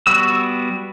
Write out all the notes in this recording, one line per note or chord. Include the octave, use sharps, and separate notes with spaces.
G3 B3 F#4 E6